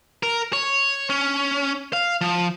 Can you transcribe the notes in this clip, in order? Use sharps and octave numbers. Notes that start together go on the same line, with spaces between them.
A#4
C#5
C#4
F5
F3